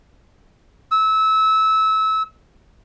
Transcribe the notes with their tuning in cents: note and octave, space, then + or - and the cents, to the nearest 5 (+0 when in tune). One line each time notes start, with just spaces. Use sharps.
E6 -25